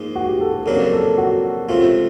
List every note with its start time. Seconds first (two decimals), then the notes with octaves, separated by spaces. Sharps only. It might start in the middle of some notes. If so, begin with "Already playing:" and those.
Already playing: G#2 F3 A#3 D#4 G#4
0.15 F#4
0.29 G4
0.41 A4
0.53 A4
0.66 F2 C#3 F#3 A#3 D4 A#4
0.92 A4
1.18 F#4
1.68 C#2 C3 F3 A3 F4